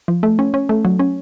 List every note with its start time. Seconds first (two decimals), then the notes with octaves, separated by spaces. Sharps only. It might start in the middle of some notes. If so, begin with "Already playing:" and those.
0.08 F3
0.23 A3
0.39 C#4
0.54 C#4
0.69 A3
0.85 F#3
0.99 C#4